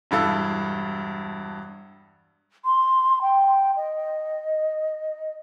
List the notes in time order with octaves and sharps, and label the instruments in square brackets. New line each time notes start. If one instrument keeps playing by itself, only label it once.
[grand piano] E1 G2 E4 A4 F5 E6
[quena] C6
G5
D#5